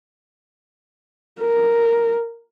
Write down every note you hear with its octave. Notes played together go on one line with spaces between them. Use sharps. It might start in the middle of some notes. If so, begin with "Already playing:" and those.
A#4